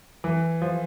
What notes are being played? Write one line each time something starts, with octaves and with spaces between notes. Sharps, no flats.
E3
F3